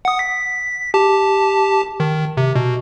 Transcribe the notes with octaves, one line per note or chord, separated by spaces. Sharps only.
F#5 D#6
B6
G4 A5
D#3
C3
B2